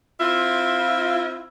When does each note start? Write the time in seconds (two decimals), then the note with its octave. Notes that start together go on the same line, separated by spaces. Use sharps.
0.20 C4 E4 F4